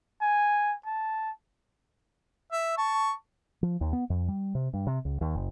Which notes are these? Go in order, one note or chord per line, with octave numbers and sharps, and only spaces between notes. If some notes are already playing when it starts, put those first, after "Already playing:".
G#5
A5
E5
A5 C#6
F3
D#2
B3
F2
G3
C3
G2
C3
C#2
D#2
F#1